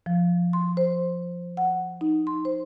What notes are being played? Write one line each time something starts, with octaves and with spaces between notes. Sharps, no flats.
F3
C6
C5
F#5
D#4
C6
C5